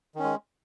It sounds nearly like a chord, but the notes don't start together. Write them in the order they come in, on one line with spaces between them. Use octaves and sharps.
D#3 C#4 G#3